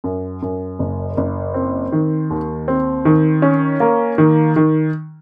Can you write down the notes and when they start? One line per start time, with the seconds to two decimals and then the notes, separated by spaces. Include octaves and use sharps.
0.04 F#2
0.42 F#2
0.79 F#1
1.17 F#1
1.54 C4
1.92 D#3
2.30 D#2
2.68 C4
3.05 D#3
3.42 C#4
3.80 A#3
4.18 D#3
4.56 D#3